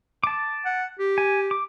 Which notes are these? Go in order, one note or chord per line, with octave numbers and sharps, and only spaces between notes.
A5 D6
F#5
G4
G#5
D6